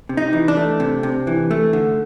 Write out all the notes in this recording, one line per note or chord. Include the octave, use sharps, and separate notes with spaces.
C3
D#4
E3
D4
A3
C3
C3
E3
A3
D3